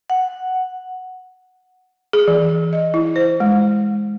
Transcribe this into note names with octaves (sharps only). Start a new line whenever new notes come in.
F#5
G#4
E3
D#5
E4
C5
G#3